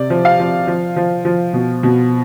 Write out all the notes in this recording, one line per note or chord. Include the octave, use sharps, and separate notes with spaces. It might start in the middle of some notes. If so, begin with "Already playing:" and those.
Already playing: C3 D5
F3
F5
F3
F3
F3
F3
B2
B2